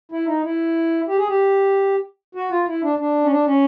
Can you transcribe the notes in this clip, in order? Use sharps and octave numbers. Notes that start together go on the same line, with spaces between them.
E4
D#4
E4
G4
G#4
G4
F#4
F4
E4
D4
D4
C#4
D4
C#4